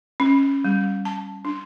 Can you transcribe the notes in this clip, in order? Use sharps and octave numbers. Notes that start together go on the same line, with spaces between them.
C#4
G3
A5
D4